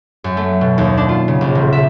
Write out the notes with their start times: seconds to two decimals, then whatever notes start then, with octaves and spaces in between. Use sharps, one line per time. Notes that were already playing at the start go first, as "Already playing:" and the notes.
0.24 F#2
0.37 A3
0.61 B2
0.78 D#2
0.97 D4
1.09 F4
1.28 C#3
1.41 A#1
1.55 D#1
1.73 E5